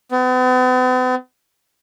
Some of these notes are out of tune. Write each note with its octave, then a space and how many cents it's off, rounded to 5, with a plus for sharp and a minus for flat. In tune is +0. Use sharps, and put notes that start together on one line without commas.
B3 +45